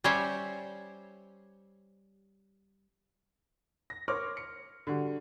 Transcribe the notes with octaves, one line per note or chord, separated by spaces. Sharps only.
G3 C#4 G4 C5 C#5 E5
A#6
A#4 C5 C#5 C#6 D6 F6
C#7
D3 G3 F#4